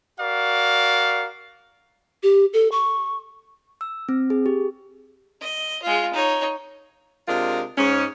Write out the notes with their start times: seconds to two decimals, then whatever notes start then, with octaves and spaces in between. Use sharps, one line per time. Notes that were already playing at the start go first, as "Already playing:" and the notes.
0.19 F#4 A#4 D5 F5
2.23 G4
2.53 A4
2.72 C#6
3.81 E6
4.09 C4
4.30 G#4
4.46 G4
5.41 D#5
5.82 G#3 F4
6.13 D#4 C#5
7.27 C3 G#3 D4 F4 A#4
7.77 G#2 C#4